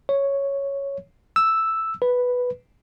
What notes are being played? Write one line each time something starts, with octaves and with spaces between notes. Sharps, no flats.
C#5
E6
B4